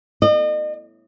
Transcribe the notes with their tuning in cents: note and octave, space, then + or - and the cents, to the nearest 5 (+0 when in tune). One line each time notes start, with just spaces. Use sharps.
D#5 -40